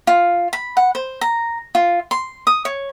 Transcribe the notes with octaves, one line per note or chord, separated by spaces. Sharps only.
F4
B5
F#5
C5
A#5
F4
C6
D#6
C#5